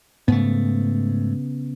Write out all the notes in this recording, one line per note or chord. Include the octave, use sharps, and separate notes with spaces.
G#2 C#3 A3 B3